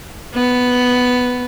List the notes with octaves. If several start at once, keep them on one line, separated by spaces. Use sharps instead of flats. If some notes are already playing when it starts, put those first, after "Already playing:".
B3